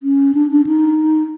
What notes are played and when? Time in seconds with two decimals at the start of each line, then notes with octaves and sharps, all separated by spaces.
0.03 C#4
0.35 D4
0.51 D4
0.67 D#4